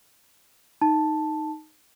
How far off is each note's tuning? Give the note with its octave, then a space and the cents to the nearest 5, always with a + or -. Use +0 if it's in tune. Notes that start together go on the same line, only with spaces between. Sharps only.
D#4 +0 A5 +0